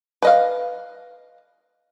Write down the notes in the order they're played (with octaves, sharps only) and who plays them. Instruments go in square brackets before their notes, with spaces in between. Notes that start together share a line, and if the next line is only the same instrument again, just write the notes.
[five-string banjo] B4 D#5 F5